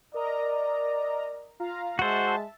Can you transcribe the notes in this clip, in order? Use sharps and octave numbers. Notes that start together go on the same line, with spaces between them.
A#4 D5 D#5 A#5
F4 F5 A#5
G#3 F#4 C5 E5 A5